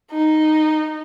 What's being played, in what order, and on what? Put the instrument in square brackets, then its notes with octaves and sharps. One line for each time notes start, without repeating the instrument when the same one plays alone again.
[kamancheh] D#4